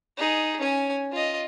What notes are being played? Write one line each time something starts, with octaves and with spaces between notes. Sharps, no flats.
D#4 G#4
C#4 G#5
F4 D#5